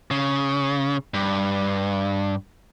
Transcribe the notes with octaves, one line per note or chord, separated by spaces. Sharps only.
C#3
G2